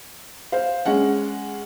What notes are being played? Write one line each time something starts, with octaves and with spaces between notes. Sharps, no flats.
C5 F5
G#3 C#4 F#5